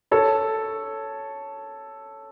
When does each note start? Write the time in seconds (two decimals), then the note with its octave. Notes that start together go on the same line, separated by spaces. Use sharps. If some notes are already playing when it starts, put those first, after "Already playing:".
0.11 A4 C#5